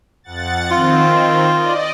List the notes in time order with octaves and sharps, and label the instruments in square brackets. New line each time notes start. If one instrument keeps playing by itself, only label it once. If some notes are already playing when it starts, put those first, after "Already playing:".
[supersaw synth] F2 F#5 A6
[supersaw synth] D#3 C4 [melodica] F4
[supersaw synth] D5 D#5